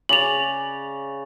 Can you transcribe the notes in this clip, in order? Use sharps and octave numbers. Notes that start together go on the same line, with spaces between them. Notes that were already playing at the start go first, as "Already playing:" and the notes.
C#3 D5 F7 F#7